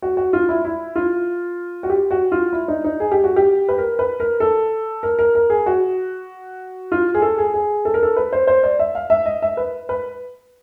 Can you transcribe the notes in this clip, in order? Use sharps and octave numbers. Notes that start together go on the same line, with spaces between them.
F#4
F#4
F4
E4
E4
F4
F#4
G4
F#4
F4
E4
D#4
D#4
G#4
G4
F#4
G4
B4
A#4
B4
A#4
A4
A#4
A#4
A#4
G#4
F#4
F4
G#4
A4
G#4
G#4
A4
A#4
A4
B4
C5
C5
D5
E5
F5
E5
D#5
E5
B4
B4